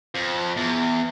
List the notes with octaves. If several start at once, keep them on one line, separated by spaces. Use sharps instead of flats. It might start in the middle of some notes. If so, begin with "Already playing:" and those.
F2
E2